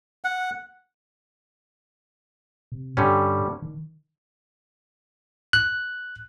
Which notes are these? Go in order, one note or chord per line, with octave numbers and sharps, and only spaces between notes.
F#5
C3
G2 D3 G3 C#4
D#3
F#6